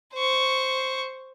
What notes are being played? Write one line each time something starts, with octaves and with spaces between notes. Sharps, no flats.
C5 C#6